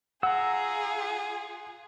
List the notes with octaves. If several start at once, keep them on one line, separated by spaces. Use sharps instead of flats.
F4 G#4 F#5 A#5 E6